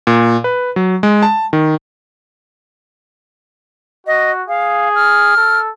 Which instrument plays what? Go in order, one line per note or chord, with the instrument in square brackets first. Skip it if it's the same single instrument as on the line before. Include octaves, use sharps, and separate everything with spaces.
[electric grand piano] A#2
B4
F#3
G#3
A5
D#3
[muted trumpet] F#4 [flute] D#5
[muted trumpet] G#4 [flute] F5
[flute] F6
[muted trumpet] A4